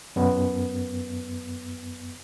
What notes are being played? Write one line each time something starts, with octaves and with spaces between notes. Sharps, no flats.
F#2 B3